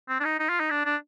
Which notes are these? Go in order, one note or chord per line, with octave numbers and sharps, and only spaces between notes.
C4
D4
D#4
D#4
F4
D#4
D4
D4